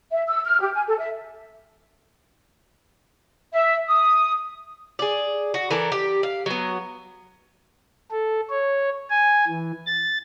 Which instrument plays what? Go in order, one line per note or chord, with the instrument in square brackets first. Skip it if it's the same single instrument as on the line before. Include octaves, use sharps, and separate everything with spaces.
[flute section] E5
E6
F6
G4
G#5
A4
E5
E5
D#6
[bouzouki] G#4 D5
F#4
E3 A4 A#4 D5
G4
F5
F#3 B3
[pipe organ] A4
C#5
G#5
E3
A6